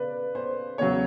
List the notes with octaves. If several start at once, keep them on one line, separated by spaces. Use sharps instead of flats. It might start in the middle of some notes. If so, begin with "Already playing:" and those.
Already playing: C#3 B4 D5
C5
E2 C#3 F#3 C#5